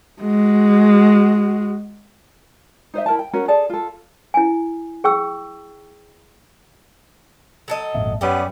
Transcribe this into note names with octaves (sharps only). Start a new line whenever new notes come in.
G#3 F#4
D#4 C5 D#5 E5
E4 A#4 A5
G5
C#4 F#4 A#4
G#4 A4 D5 A5
F4 A4
E4 G#5
G#4 G5 C#6 E6
F#3 A4 D#5
G#1 F2 A#2 E5
F#2 G3 B3 C#4 G4 D5